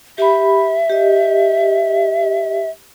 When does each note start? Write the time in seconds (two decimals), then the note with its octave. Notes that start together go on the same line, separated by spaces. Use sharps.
0.18 G4 E5 B5
0.90 G4 D#5